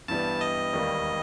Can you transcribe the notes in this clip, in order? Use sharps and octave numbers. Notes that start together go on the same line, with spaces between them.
G2 E3 G3 B3 A5
D#5
E1 D#2 D#3 G3 A#3